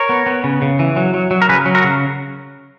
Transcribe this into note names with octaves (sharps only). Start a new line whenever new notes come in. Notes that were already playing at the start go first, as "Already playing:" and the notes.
Already playing: A#4 C#5
B3
B3
C#3
C#3
E3
F#3
F#3
F#3
A#4
C#3 G#4 B4
F#3
F#4 A#4
C#3